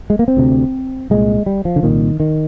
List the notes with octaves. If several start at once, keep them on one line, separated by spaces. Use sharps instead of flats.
G#3
A#3
C4
D2 C3
C2 A#2 G#3
G3
F3
D3
C2 A#2 D#3
D#3